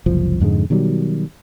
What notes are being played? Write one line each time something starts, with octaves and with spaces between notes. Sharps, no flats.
F#1 C2 F3
F2 G#2 D3 G#3
B2 D#3 F#3 G3